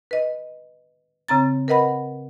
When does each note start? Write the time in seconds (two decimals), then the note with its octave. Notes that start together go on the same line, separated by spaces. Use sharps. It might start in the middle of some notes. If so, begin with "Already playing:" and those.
0.11 B4 D#5
1.28 C#3 C4 A#5 A6
1.68 A#4 B4 D#5 F#5 B5